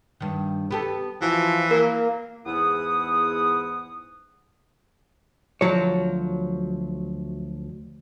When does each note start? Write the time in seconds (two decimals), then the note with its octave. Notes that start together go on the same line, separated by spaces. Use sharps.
0.20 G2 D#3
0.71 B3 G4 A4
1.22 E3 F3 F#4
1.71 A#3 A#4
2.46 E2 G#2 B3 E4 F#5 D#6
5.61 D2 F3 F#3 C#5